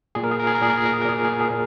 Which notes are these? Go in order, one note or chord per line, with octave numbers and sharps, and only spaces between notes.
A#2 G#4
A#4
G#4
A#4
G#4
A#4
A#2 G#4
A#4
G#4
A#4
G#4
A#4
A#2 G#4
A#4
G#4
A#4
G#4
A#2 A#4